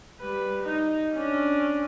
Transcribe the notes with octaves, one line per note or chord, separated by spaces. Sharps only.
G3 B4
D#4
C#4 D4